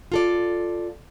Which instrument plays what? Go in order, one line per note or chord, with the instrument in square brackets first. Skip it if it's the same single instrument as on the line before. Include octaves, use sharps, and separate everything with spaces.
[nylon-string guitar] F4 A4 D5